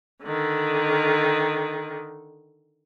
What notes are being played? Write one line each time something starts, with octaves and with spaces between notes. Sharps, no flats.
D3 D#3